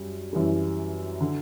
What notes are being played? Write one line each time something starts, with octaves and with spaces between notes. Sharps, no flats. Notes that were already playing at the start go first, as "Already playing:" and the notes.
Already playing: F#2 G3
F#2 E3 G3
D3